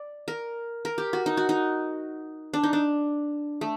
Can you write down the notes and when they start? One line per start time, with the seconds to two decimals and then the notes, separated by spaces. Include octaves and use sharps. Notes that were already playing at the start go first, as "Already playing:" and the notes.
Already playing: D5
0.28 A#4
0.85 A#4
0.98 G4
1.13 F#4
1.26 D#4
1.37 F#4
1.49 D#4
2.53 D4
2.63 D#4
2.73 D4
3.61 A3